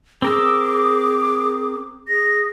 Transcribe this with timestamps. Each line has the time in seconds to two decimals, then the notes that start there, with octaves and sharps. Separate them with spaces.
0.22 C4 G#4 A#4 D6 E6
2.08 G#4 A#6